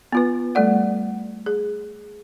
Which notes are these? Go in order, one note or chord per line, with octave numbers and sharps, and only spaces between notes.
B3 F4 B4
G3 A3 A4 D5 F#5
G#4